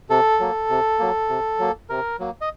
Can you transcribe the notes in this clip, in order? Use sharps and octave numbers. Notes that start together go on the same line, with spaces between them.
C3 A4
F#3 A#3
C3
F#3 A#3
C3
F#3 A#3
C3 A#4
F#3 A#3
D#5